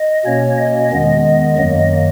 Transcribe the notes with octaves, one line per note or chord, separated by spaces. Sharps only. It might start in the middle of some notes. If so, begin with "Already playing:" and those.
Already playing: D#5
B2 A#3 C#4 C#5
D#5
E2 D#3 G#3 B3 D#5
F#2 D#3 F#3 A#3 D#5